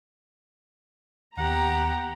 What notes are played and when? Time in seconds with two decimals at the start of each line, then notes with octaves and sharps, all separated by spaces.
1.38 D#2 B3 G4 F#5 A#5